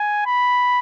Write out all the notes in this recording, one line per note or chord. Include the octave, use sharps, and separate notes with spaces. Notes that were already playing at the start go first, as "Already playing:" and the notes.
Already playing: G#5
B5